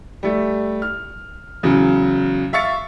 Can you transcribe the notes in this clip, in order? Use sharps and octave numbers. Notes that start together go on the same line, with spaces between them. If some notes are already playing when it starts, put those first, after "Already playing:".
G3 A3
F6
E2 C#3 F#3
E5 F5 C#6 A6 C#7